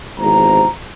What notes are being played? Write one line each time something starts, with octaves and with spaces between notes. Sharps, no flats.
G#1 E2 C3 E3 C5 A#5